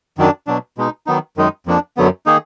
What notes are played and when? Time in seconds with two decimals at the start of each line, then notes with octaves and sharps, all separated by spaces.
0.18 F#2 D#3 F#3 D4
0.47 B2 F#3 D4
0.78 B2 G#3 D#4
1.07 D#3 F#3 B3 D#4
1.37 F#2 D#3 G#3 D#4
1.66 F2 F3 A#3 D4
1.97 F#2 D3 F#3 B3
2.26 D#3 A#3 D#4 G#4